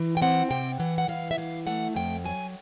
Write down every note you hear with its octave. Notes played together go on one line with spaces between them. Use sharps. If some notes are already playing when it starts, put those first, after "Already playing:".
Already playing: E3
G5
C4 F#5
C3 G5
E3 F#5
F#5
E3 F5
E5
E3 F5
A3 F#5
F2 G5
F#3 G#5